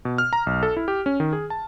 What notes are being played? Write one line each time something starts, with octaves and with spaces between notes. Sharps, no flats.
B2
F6
A#5
B1
A4
E4
G4
C#4
D#3
G#4
A5